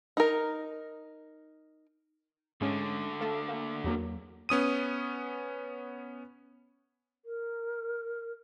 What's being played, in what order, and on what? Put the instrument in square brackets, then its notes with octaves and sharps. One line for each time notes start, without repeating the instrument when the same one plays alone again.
[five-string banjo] D#4 A#4
[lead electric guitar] D2 D3 [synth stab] G#2 G#3 C#4
[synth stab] A3 A4 F5
A#3
E2 F#3 A#3
[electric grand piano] B3 C#4 D#6 D#7
[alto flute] A#4